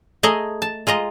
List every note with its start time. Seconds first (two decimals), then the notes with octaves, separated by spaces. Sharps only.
0.23 A3 G#4 D#5 A#5
0.62 A5
0.87 G#3 F4 D#5 A#5